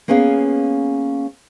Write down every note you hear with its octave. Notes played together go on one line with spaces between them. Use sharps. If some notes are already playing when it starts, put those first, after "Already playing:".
A#3 B3 C#4 G#4 F5